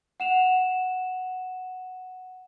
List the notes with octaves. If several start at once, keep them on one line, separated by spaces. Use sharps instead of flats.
F#5 E7 F7